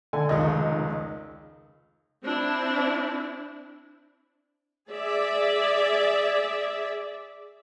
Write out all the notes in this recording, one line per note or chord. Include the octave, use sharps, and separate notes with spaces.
D3 A4 G#5
F1 C#2 D#3 D#5
C4 D4 E4
G#4 D5 E5